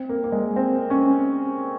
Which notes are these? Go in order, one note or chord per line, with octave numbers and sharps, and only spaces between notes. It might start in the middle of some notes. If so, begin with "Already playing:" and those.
Already playing: C4
A#3
A#3
G#3
C4
C#4